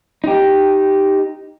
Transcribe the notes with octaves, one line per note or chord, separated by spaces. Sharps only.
D#4 G4